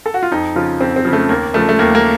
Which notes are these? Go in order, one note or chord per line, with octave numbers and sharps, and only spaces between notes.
A4
F#4
F4
F2 D#4
C#3 F3 F4
F2 C4
C4
C#3 F3
A3
D#2 A#3
C#3 F3 A3
A3
D#2 A#3
A#3